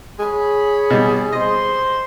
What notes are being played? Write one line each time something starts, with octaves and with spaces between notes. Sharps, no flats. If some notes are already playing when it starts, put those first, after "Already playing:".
G#4 C#5 B5
B2 G3
C5 D#5 C6